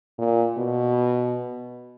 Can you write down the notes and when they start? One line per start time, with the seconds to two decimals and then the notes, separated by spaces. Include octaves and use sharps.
0.19 A#2
0.58 B2